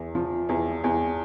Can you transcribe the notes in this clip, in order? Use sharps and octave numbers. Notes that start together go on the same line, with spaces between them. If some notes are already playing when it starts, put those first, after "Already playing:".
Already playing: E2
F3
E2
E2